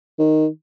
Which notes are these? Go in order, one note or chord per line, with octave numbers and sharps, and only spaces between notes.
D#3